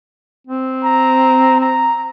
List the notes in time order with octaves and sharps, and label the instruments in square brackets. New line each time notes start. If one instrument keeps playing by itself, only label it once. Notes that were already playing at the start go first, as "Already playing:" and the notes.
[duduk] C4
[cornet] A#5
A#5